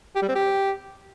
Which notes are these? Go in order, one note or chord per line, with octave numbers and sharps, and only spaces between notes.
G4
G3
C4
G4